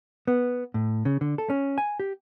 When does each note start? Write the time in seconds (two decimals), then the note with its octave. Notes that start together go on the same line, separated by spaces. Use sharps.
0.27 B3
0.74 A2
1.05 C#3
1.21 D3
1.38 A4
1.50 C#4
1.78 G#5
2.00 G4